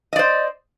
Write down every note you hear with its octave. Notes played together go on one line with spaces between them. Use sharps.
C5 D5 D#5